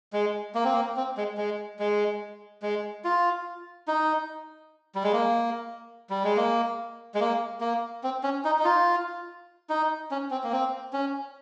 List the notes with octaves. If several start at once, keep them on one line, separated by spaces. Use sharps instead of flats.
G#3
A#3
C4
A#3
C4
G#3
G#3
G#3
G#3
F4
D#4
G3
G#3
A#3
G3
G#3
A#3
G#3
A#3
A#3
C4
C#4
D#4
D#4
F4
D#4
C#4
C4
A#3
C4
C#4